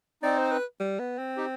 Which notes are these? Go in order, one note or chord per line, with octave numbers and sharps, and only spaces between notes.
C4 D#4 D5
C5
B4
G3
B3
C4
D#4 G4